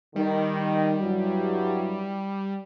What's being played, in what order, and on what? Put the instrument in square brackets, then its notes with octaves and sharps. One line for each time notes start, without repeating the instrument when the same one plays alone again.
[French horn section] D#3 [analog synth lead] G3
[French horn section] G2 F#3 E4